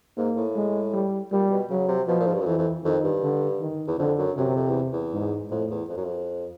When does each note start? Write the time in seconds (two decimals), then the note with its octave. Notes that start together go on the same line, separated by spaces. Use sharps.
0.17 G#2 A#3
0.36 A2
0.55 G#3
0.93 G3
1.32 A#2 G3
1.50 B2
1.70 C#3 F#3
1.88 C3
2.08 B2 F3
2.20 A#2
2.26 G#2
2.34 G2
2.41 F#2
2.46 F2 E3
2.58 F2
2.84 F2 D#3
3.04 G2
3.22 D3
3.60 D#3
3.87 E2
3.98 F2 D3
4.18 F#2
4.37 F#2 C3
4.56 F2
4.68 E2
4.93 E2
5.13 G#2
5.51 F2 A2
5.70 E2
5.89 F2
5.97 F#2
6.05 F2